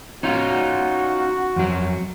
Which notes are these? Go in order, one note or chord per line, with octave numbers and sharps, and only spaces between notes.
C#4 D#4 F4 F#4
F2 F#3